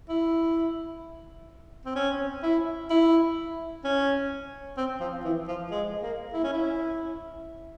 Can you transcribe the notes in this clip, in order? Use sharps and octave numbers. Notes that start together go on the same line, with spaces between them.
E4
C4
C#4
E4
E4
C#4
C4
F3
E3
F3
G#3
A#3
E4
C#4
E4